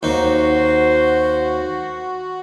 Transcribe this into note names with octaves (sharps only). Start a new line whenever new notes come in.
D#2 D#4 F#4 C5